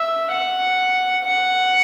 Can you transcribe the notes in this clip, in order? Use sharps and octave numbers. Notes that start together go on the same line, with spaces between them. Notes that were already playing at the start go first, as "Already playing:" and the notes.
Already playing: E5
F#5
F#5